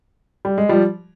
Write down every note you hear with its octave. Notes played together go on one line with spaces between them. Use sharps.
G3
G#3
F3 G3